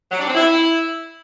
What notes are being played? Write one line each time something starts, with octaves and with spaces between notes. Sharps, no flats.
F#3
D4
C4
E4